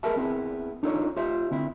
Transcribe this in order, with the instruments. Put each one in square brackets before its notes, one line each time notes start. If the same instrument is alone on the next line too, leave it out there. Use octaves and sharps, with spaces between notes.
[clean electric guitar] G#4 A#4 B4 E5 A5
B3 C4 E4 G#4
D4 D#4 F4 A4 B4 C#5
F4 G4 C5 E5
D3 C4 E4